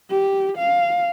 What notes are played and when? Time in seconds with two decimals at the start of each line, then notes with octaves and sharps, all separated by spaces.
0.11 G4
0.57 F5